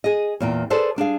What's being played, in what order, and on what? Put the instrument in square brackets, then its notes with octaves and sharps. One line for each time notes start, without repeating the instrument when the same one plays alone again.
[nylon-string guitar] G#4 D#5
E2 A#2 G5
G#4 A4 B4 C5 D5 A5
G3 D4 G#4 F5